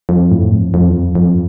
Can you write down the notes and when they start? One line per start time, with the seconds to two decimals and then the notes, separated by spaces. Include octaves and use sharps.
0.09 F2
0.31 A2
0.52 F2
0.74 F2
0.89 E2
0.94 F2
1.15 F2